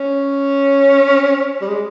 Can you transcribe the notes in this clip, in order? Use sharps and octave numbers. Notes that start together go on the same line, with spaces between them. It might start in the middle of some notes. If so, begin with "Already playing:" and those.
Already playing: C#4
G3
G#3